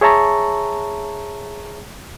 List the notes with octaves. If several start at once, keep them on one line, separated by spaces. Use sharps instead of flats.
G#4 C#5 E5 A5 A#5 C#6